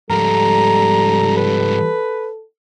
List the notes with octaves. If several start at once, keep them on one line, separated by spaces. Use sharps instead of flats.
G#2 F3 G3 A4 A#5
B4